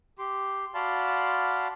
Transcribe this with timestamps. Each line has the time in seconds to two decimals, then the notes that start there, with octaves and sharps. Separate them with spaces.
0.19 G4 C6
0.74 F#4 D5 F5 A5 B5 C6